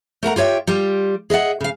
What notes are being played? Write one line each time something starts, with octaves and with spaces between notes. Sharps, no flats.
A3 A#4 F#5 A#5
F4 G4 C#5 E5 G5
G3 F4 G4
G#4 D#5 E5 F#5
C#3 F5